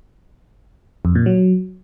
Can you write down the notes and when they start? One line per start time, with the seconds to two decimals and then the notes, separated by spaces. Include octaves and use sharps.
1.05 F2
1.15 A#2
1.26 F#3